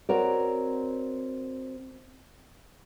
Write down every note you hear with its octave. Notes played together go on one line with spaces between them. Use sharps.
C4 F#4 A#4 C#5 D5